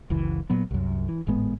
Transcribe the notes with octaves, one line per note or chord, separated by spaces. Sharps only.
F#1 C#2 E3
A#2 F#3 B3
C2 F#2
E3
G#1 A2 G#3 B3